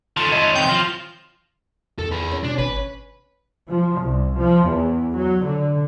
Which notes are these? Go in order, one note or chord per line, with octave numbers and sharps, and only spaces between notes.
D#3 C#4 F4 A4 A5
C#5 D#5 E5 C6
F#3 C4 G6
F3 F4 F5 A#6
E2 D#3 A4
G#4 B4
C#4
B2 D4
G#1 C#4 B4
F3
C2
F3
E2
F#3
D3